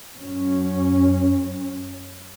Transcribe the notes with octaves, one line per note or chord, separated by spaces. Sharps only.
F#2 C#4